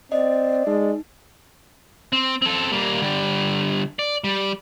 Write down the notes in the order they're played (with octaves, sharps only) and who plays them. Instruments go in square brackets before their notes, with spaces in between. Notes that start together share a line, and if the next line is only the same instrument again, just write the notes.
[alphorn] C4 [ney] D5 [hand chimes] D#5
[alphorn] G#3 [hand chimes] D#4
[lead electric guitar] C4
C4 A4
G3 A#3
D3 G3
D5
G3